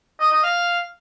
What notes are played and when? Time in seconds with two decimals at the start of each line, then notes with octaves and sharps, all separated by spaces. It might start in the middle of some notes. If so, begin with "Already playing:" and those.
0.20 D#5
0.31 D#5
0.43 F5